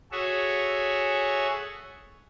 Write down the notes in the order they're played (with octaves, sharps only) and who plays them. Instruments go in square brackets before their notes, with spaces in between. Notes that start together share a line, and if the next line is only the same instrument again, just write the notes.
[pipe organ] F#4 G#4 A4 C#5 E5